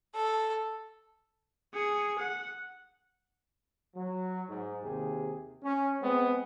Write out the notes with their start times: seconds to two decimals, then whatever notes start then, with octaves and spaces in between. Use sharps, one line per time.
0.15 A4
1.73 G#4 C#7
2.19 F#5
3.95 F#3
4.49 G#2
4.83 D#2 C3 G4 G#4
5.63 C#4
6.01 G#3 B3 C4